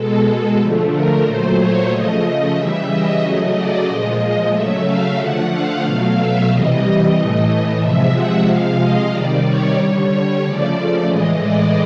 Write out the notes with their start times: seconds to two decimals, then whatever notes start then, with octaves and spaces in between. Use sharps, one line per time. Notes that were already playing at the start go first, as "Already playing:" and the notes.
Already playing: B2 G#3 A4
0.59 D3 F3 A3
0.92 A#4
1.24 A#2 F#3 A3 C5
1.57 C#5
1.90 C#3 F3 A3 D#5
2.55 C#3 E3 G3 E5
2.89 D#5
3.21 C#3 F#3 A3
3.54 D5
3.87 A#2 F3 G#3 D#5
4.52 C#3 F#3 A3 E5
4.85 F5
5.18 D3 F3 A3 F#5
5.51 F5
5.84 B2 F#3 A3 F5
6.16 E5
6.49 C3 E3 G3 D#5
7.15 A2 E3 A3 D#5
7.80 C3 F3 G#3 E5
8.12 F#5
8.46 C3 F3 G#3 F5
8.78 D#5
9.12 C3 D#3 G3 D5
9.44 C#5
9.77 D3 G3 C#5
10.09 C#5
10.42 C#3 F3 A3 D5
10.76 D5
11.08 A2 E3 G#3 D#5
11.41 D5